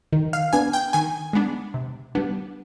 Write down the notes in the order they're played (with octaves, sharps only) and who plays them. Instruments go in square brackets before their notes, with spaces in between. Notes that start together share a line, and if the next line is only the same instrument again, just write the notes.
[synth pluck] D#3
F5
B3 D4 G#5
G5
D#3 G#5
G#3 B3 D4
C3
G3 B3 D4